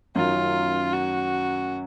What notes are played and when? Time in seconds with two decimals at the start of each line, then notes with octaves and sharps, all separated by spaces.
0.15 F#2 D#3 F#3 F4
0.93 F#4